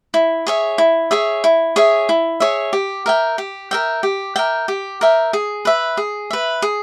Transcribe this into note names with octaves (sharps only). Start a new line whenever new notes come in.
E4
G#4 C#5 E5
E4
G#4 C#5 E5
E4
G#4 C#5 E5
E4
G#4 C#5 E5
G4
A#4 E5 G5
G4
A#4 E5 G5
G4
A#4 E5 G5
G4
A#4 E5 G5
G#4
B4 E5
G#4
B4 E5
G#4